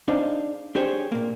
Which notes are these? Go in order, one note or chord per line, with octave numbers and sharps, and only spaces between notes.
D4 D#4 G#4 C5 F5
D4 G4 G#4 C5 C#5
A#2 A#3